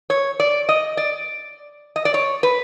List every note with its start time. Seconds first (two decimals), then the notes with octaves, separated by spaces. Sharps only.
0.10 C#5
0.40 D5
0.69 D#5
0.97 D5
1.96 D#5
2.05 D5
2.14 C#5
2.43 B4